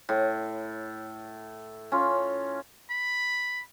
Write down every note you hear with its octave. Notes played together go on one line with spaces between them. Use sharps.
A2
C#4 F4
B5